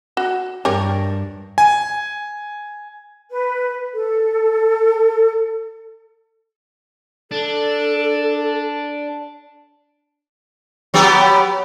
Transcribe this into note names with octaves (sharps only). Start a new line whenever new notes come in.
F#4
G2 G4 A#4 C#5
G#5
B4
A4
D4 A4
F#3 B3 G4